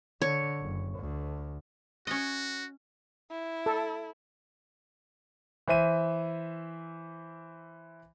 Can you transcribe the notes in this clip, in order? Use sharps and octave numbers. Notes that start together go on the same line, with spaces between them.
D3 C#5
F#1
D2
C#4 F#4 D#5
E4
A4
E3 C5 E5 D#7